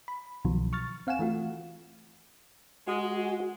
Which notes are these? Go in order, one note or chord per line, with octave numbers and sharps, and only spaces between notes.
B5
C2 B2 D#3 F3 F#3
C#6 F6 A6
C4 F5 F#5 G#5 E7
E3 A3 F4 F#4
G#3 F#4